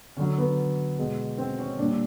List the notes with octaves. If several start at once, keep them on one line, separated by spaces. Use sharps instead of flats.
D3 F#3 C#4
B3
B2 G#3
C4
C#4
A#2 G3 D4